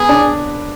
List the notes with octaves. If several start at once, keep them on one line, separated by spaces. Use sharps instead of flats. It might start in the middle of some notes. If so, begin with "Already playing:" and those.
Already playing: B3 G#4 B4
D4 D5